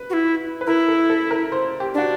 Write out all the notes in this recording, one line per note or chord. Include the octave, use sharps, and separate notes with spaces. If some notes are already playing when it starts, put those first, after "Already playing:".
Already playing: B4
F#4
E4
B4
E4 A#4
A4
A4
A#4
C5
G4
D4 F#4